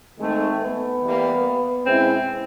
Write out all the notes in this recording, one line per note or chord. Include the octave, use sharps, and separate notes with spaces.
D#3 G#3 A3 C4 D#4 G#4
B3
E3 G3 A#3
B2 G#3 C4 C#4 E4